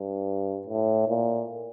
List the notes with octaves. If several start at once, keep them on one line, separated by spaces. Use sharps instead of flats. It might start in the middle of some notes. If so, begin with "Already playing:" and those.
Already playing: G2
A2
A#2